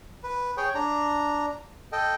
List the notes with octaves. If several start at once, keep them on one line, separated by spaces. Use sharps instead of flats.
B4
G#4 C#5 G5
D4 A#5
A4 D#5 G5